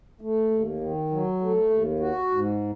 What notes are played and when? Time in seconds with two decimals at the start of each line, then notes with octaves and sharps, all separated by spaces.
0.21 A3
0.51 D#2
0.81 D#3
1.11 F#3
1.41 A3
1.70 D#2
2.00 F#4
2.31 G#2